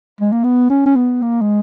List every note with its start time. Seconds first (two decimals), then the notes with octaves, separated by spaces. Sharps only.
0.21 G#3
0.32 A#3
0.44 B3
0.70 C#4
0.86 C#4
0.96 B3
1.22 A#3
1.41 G#3